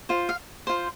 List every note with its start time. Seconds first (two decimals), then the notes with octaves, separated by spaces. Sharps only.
0.09 F4 C5
0.29 F5
0.67 F4 C5